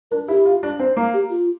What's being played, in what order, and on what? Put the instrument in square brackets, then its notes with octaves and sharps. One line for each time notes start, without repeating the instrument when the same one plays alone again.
[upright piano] D4 [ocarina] A#4
[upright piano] E4 [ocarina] G4
[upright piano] F4
D4
C4
A#3
[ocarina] G4
F4